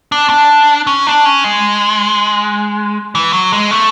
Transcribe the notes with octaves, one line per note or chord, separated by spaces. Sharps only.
D4
D4
C#4
D4
C#4
G#3
E3
F#3
G#3
A3